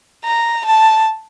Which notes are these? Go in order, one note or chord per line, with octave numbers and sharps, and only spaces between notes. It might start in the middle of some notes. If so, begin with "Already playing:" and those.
A#5
A5